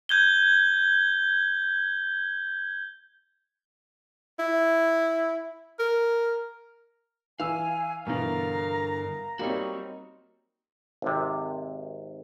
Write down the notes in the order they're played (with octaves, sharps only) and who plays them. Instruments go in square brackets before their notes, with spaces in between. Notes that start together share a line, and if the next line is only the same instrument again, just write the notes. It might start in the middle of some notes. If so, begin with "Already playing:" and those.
[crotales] G6 G#6 G7
[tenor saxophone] E4
A#4
[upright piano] E3 E6 [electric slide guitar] F5 [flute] G#5
[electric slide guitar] G2 D3 [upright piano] B2 E3 [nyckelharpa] A#4 F5 [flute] A#5
[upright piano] G3 A#3 [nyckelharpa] C4 D#4 [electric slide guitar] F#4 C#5
[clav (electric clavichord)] G#1 C3